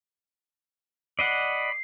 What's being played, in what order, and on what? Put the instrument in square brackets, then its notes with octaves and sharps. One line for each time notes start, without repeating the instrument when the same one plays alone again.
[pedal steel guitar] D5 D#5 F#5 [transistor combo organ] B5 [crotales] C7